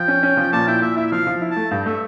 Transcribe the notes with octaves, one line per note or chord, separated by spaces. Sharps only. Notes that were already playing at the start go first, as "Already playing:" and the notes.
Already playing: F3 G5
C#4
C#4
F3
A#2 A5
E4 G5
A#2 E5
E4 E5
E5
F3 F5
F3
E4
A5
A3
G2 G5
A3 E5